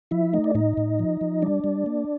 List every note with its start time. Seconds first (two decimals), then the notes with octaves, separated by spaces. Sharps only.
0.11 F3 E4 E5
0.33 A3 D#4 D#5
0.44 D5
0.55 A2 D#4 D#5
0.77 A2
0.99 F3
1.21 F3
1.42 G3 D4 D5
1.64 G3
1.86 A#3